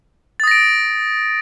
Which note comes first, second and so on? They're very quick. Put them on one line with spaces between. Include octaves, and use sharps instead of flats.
A6 D#6 A#6 D7